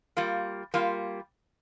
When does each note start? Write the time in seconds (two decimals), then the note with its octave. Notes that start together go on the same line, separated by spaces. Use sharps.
0.17 G3 A#3 F4
0.74 G3 A#3 F4